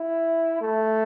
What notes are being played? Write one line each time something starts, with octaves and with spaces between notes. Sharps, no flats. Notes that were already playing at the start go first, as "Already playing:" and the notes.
Already playing: E4
A3